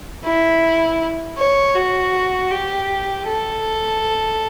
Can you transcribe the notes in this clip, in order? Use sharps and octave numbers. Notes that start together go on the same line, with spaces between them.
E4
C#5
F#4
G4
A4